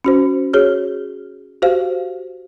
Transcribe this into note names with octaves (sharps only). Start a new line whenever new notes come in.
C#4 F#4 C5
F#4 G#4 C#5 F6
F#4 G4 C5 F5